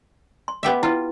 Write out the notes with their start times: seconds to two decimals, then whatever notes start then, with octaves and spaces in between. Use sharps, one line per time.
0.48 C6
0.63 B3 G4 E5
0.83 E4 F4 B4